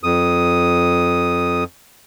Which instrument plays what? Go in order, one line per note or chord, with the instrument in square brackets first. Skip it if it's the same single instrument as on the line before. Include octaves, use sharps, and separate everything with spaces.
[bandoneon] F2 D#6